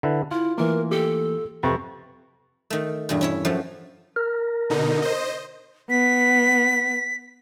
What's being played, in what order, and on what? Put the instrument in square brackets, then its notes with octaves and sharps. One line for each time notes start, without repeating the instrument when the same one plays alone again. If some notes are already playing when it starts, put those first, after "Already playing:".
[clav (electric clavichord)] D3 E4 B4
[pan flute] E4 [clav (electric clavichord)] F4
[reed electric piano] E3 A3 A#3 [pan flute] A#4
[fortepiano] G4 [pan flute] A4
[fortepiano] F2 [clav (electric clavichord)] C3 B4 [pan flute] C#6
[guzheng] D#3 A3
E2 G2 B2
C#4 E4 C#5
F#2 F3 A3 F#5
[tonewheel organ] A#4
[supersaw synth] B2 D3 D#4
C5 D#5
[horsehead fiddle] B3 [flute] B6